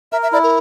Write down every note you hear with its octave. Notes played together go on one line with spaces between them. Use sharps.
A#4 E5
E5
E4 D5
A#4